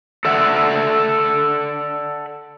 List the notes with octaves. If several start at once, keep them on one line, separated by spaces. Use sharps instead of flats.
A4 D5 E5 F#5